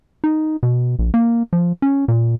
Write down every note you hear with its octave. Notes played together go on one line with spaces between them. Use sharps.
D#4
B2
A#1
A#3
F3
C#4
A#2